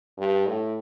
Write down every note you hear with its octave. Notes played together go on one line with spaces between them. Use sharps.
G2
A2